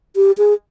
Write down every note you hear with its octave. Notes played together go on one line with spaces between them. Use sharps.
G4
G#4